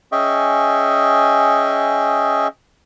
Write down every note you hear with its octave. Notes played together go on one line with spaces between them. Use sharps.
C#4 G#4 D#5 E5 G5 C#6